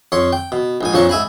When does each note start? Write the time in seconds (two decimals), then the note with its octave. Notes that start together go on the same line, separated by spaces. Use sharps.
0.12 F2 C#5 C6
0.33 G5
0.52 B2
0.81 A#1 G#2 G#5
0.93 A#1 F2 F3 D4 C#5 A#5
1.09 G#2 E5 G#5 B5